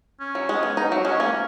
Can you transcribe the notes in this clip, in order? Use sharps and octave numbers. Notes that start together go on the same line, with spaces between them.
C#4
F#3
G#3
B3
D#4
F#3
G#3 C#4
A#3